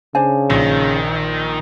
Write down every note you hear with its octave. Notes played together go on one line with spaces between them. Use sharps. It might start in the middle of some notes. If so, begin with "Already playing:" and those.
C#3 D4 C5 G#5
A#1 D#3